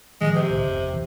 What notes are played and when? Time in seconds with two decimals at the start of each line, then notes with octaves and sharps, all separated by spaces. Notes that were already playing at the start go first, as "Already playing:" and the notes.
0.21 A2 D#3 F3 G#3
0.35 C3
0.50 C2 A2 C#3
0.63 G1 F2
0.91 D1 B2 E3